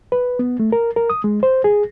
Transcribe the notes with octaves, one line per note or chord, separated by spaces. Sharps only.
B4
B3
A3
A#4
A#4
D#6
G#3
C5
G#4